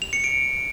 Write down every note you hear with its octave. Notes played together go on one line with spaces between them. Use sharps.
F7
C#7
D7